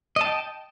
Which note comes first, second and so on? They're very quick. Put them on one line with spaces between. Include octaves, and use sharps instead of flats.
D#5 A5 G5